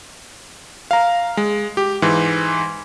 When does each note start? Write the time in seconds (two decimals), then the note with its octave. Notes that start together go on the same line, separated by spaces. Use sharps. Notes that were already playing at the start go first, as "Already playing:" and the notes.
0.91 F5 A#5
1.37 G#3
1.77 G4
2.02 G#2 E3